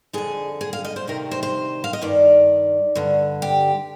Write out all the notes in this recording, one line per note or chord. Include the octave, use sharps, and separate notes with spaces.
F2 D3 G#4
G#4
F5
D#5
C5
D2 C3 D#3 A#4
C5
C5
F5
D#5
G2 D#3 D5
G2 D3
G4